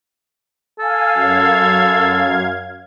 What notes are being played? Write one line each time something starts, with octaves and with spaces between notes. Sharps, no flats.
A4 F5 G#5
F#2 F5 G#6